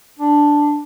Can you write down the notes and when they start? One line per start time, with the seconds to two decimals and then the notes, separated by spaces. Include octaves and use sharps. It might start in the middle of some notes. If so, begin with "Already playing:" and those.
0.19 D4